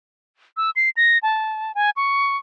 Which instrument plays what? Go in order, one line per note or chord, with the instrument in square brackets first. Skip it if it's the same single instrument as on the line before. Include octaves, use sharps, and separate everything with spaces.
[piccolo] E6
C7
A#6
A5
G#5
C#6